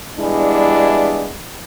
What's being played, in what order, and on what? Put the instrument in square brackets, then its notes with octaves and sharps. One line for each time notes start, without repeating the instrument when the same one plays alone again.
[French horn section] E3 G3 G#3 B3 D4 E4